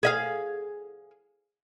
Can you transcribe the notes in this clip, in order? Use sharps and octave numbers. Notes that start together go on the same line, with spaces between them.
G#4 E5 F5